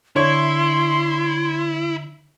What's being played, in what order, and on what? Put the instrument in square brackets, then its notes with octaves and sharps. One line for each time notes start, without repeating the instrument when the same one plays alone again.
[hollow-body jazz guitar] D3 [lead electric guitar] E4 [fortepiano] C#5 [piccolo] C6